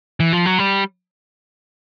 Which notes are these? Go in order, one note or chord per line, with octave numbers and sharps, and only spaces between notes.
E3
F3
F#3
G3